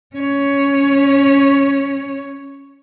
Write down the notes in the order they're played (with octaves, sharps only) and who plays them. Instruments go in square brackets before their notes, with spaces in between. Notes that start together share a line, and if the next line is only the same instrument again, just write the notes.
[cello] C#4 C#5